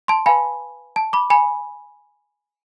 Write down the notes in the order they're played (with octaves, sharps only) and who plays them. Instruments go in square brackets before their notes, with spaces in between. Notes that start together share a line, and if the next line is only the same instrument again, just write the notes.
[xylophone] A5 C6
B4 F5 G#5 B5
A5
B5 D6
G#5 B5